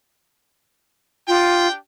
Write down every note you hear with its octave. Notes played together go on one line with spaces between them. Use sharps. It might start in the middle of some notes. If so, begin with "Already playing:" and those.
D4 F4 G4 G5